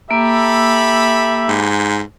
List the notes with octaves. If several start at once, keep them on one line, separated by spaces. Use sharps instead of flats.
A#3 G4 A4 E5 B5
G#2